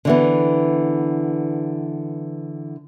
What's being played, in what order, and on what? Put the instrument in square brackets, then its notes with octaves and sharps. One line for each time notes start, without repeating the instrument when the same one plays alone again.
[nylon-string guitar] D3 E3 B3